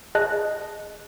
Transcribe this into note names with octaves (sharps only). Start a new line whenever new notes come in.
G#4 D#5 A5 F#6